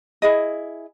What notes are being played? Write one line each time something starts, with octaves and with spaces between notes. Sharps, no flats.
E4 G#4 D#5